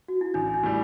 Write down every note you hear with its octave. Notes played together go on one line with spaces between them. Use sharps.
F#4
E4
A1 D4
D4
A2 G3